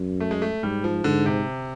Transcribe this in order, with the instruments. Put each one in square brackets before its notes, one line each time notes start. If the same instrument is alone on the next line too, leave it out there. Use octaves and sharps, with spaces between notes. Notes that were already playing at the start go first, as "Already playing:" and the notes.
Already playing: [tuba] F#2
[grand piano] A3
G#3
A3
[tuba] G#2 [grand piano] G3
[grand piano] F3
[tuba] G#2 [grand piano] D3
[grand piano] C3